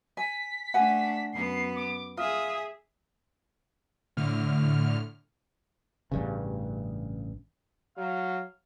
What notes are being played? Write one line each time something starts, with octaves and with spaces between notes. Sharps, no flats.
G#5 B6
A3 D4 F#5 G#5
F#2 B3 C7
D6
F4 G#4 E5 D#6
A2 D3 F6
A1 G2 C#3
F#3 F5